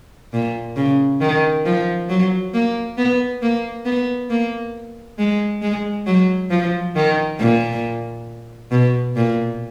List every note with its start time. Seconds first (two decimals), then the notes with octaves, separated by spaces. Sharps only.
0.33 A#2
0.76 C#3
1.21 D#3
1.65 F3
2.09 F#3
2.54 A#3
2.98 B3
3.42 A#3
3.85 B3
4.30 A#3
5.19 G#3
5.62 G#3
6.07 F#3
6.50 F3
6.96 D#3
7.39 A#2
8.71 B2
9.16 A#2